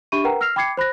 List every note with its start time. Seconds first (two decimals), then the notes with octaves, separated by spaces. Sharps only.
0.12 D4 G4 E5 B5 C#6 D#7
0.24 A#4 B4 F#5 G5 A#5
0.41 E6 F6 A#6 C7 F7
0.56 G5 B5 D6 G#6 C7 C#7
0.77 C5 B5 F#6 A#6